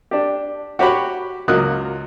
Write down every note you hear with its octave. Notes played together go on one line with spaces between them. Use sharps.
D4 G4
F#4 G4 C#5 B5
C#2 F#3 F4 A#4 D#6 F#6